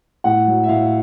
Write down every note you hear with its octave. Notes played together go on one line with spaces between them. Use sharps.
A2 F#5
F#3
E5
A2 F5